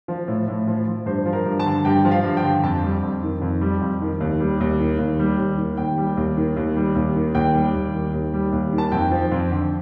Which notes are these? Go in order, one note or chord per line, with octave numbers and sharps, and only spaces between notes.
F3
A2
A2
F3
F3
G2 C5
F3
A#4
G2
A5
D3
G2 G5
F3
F5
G2
G5
D3
F2 A5
G3
F2
D#3
F2
G3
F2
D#3
D#2
G3
D#2
D#3
D#2
G3
D#2
D#3
D#2 G5
G3
D#2
D#3
D#2
G3
D#2
D#3
D#2 G5
G3
D#2
D#3
D#2
G3
D#2
D#3
A5
F2 G5
F3
F2
D3